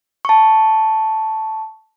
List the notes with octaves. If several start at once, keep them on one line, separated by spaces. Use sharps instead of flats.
A5 C#6